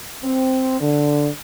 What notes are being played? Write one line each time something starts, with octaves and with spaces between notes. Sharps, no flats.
C4
D3